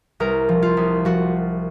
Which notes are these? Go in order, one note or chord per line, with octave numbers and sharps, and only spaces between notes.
C2 A#4
F3
F4
C2
F3 F#4